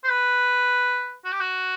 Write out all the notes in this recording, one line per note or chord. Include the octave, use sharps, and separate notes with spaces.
C5
B4
F#4
G4
F#4